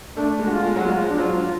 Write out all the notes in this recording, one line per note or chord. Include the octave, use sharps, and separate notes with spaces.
A3 D4
G#3
F#4
F4
G#3
F#3 F#4
G#3 F4
F3
D4
F#3 F4
F3